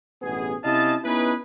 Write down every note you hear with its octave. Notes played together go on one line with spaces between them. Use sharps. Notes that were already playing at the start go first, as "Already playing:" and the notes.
A1 G2 B2 B3 G#4
C3 C#4 E4 D#5 F5 A5
B3 C#4 D#4 E4 G#4 B4